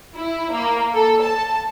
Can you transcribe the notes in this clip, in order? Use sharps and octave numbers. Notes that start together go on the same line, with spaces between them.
E4
A#3
A4
A5